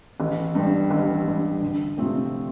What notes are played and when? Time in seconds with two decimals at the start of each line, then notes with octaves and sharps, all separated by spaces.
0.20 A1
0.55 G2 G3
0.91 A1
1.26 G2 G3
1.62 D2
1.98 C3 F3 A3 C4